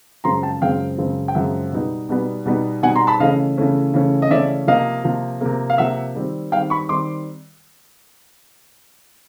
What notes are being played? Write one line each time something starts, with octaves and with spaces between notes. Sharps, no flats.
F#2 C#3 F3 G#3 C4 A#5 C6
G5 A5
F#2 C#3 F3 G#3 C4 F5 G5
F#2 C#3 F3 G#3 C4
G5
F#2 C#3 F3 G#3 C4 E5 F#5
B2 G3 B3 D#4
B2 G3 B3 D#4
B2 G3 B3 D#4
B2 G3 B3 D#4 F#5 G#5
A#5 C6
A5 B5
C#3 E3 A3 C#4 D#5 F5
C#3 E3 A3 C#4
C#3 E3 A3 C#4
D#5
C#3 E3 A3 C#4 D5 E5
C3 F3 A#3 D#5 F5
C3 F3 A#3
C3 F3 A#3
F5
C3 F3 A#3 E5 F#5
D#3 G3 C4
D#3 G3 C4 F5 G5
B5 C#6
D#3 G3 C4 C6 D6